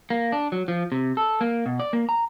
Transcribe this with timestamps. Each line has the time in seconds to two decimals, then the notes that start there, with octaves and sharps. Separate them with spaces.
0.10 A#3
0.32 D4
0.52 F#3
0.68 F3
0.92 C3
1.17 A4
1.41 A#3
1.66 B2
1.80 D5
1.93 A#3
2.09 A#5